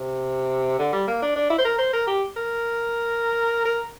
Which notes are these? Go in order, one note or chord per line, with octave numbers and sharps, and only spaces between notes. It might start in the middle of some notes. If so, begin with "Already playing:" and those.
Already playing: C3
D3
G3
A#3
D4
D4
E4
C5
A#4
C5
A#4
G4
A#4
A#4